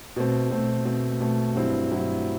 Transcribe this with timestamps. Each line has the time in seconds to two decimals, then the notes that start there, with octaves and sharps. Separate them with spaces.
0.16 B2 A3 C4
0.50 B2 A3 C4
0.85 B2 A3 C4
1.20 B2 A3 C4
1.55 G2 F#3 C4 E4
1.91 G2 F#3 C4 E4